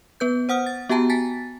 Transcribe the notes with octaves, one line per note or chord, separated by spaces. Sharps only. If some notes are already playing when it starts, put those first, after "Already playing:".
B3 B4 G6
C5 F#5 D#6 F6
A6
B3 F#4 G4 G5 A5 A#5
G#5 A5 A6 B6